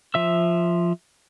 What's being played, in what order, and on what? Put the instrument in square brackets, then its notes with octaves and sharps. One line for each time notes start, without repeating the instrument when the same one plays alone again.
[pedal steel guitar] F3 E5 E6